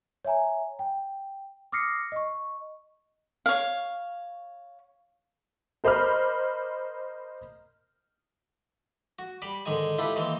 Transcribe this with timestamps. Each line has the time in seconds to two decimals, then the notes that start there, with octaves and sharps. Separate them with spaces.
0.25 C#5 E5 G#5 A#5
0.79 G5
1.72 D6 D#6 F6 A#6 C7 C#7
2.12 D#5 C#6
3.46 C#5 F5
5.84 A#4 C5 D#5 B5 D6 F6
9.19 F#4
9.42 G3 B5 D6
9.66 G#2 D3 D#3 G#3 G#5
9.98 E4 F4 G4 A4 B4
10.16 D#3 E3 G#3 A#3 C4